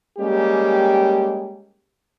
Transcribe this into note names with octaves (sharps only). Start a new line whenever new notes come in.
G3 G#3 A#3 C#4 G4